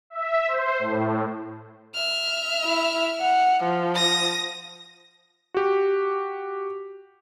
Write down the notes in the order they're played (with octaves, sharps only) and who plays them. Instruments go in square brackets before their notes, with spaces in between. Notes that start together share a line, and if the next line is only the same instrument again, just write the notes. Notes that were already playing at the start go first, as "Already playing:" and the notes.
[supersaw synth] E5
C5
A2
[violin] E5 F6
[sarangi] E4
F#5
F3
[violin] D#6 A#6
[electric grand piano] F#4 G4